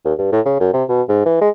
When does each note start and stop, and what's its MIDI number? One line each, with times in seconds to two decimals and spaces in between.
0.05 0.13 39
0.18 0.28 43
0.32 0.40 45
0.46 0.59 49
0.60 0.70 42
0.73 0.84 48
0.89 1.02 47
1.09 1.24 44
1.26 1.39 52
1.41 1.49 56